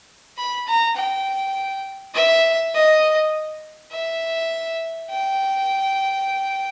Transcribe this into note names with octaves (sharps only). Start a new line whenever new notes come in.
B5
A#5
G5
E5
D#5
E5
G5